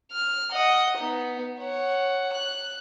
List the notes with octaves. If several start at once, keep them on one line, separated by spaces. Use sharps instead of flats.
F6
D#5 F#5
B3 D#4
C#5 F#5
F#6